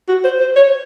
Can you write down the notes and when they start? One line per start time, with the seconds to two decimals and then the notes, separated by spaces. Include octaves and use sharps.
0.08 F#4
0.25 C5
0.40 C5
0.56 C#5